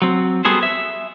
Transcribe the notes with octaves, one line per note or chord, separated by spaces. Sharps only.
F#3 C4
G3 B3 F#4 G#4 A4 C5
E5